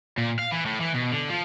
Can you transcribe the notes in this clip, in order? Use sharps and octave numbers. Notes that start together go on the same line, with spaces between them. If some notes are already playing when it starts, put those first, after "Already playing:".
A#2
F5
E3
A2
E3
B2
D3
F3